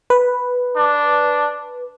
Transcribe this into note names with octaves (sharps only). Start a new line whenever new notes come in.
B4
D4